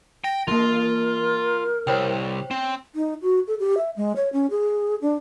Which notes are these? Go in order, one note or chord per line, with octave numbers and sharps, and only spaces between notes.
G5 A#6
E3 A#3 F4 A#4
C2 C5 C#5 G5
C4
D#4
F#4
A4
G4
E5
G#3
C#5
C#4
G#4
D4